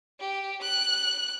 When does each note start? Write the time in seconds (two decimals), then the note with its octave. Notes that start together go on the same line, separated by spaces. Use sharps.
0.20 G4
0.61 F#6